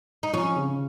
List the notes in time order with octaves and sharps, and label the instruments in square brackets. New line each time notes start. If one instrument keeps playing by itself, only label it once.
[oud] D#4
[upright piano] F3 [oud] C#4
[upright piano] C#3